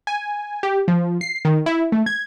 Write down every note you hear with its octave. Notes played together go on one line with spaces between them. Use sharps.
G#5
G4
F3
C7
D#3
E4
A3
G#6